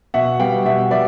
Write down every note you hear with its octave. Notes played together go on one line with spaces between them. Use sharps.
B2 E5 F#5
G3 B3 F5 G5
B2 E5 F#5
G3 B3 D5 E5